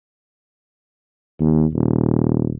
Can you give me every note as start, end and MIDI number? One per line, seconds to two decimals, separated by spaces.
1.40 1.65 39
1.74 2.53 27